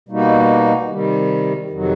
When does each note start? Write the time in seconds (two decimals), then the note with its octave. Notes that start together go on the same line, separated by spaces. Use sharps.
0.09 B2 G3 A#3 D#4 F#4
0.89 C3 D#3 G3
1.70 F2 C3 D#3 F#3